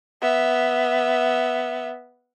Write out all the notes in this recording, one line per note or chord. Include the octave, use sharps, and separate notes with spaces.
B3 E5